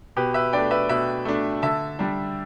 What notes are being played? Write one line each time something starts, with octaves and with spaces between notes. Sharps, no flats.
B2 G4 B4
B4 E5
A3 D4 D5 G5
B4 E5
B2 B4 E5
A3 D4
D3 E5 A5
G3 D4